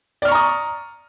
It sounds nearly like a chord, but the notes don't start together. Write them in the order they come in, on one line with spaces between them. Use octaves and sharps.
D5 F6 C#6 A#5 D#6